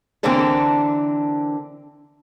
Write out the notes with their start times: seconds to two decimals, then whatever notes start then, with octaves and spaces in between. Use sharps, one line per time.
0.23 D3 E3 A#3 C4 D4 A4